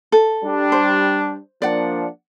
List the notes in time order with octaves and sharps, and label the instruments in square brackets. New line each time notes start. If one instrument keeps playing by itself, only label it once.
[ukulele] A4
[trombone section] G3 D4
[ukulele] C5
[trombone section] F3 A#3 D4 [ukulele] D5 F#5